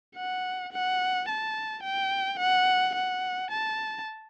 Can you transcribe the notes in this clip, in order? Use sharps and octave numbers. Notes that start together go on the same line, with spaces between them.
F#5
F#5
A5
G5
F#5
F#5
A5